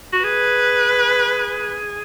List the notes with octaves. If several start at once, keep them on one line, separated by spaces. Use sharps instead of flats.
F#4
G#4 B4